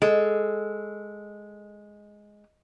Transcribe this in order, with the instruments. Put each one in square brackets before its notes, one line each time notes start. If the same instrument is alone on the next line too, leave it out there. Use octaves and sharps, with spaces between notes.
[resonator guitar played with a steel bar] G#3 [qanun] A4